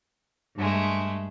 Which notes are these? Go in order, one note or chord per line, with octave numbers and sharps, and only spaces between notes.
G2 G#3 A3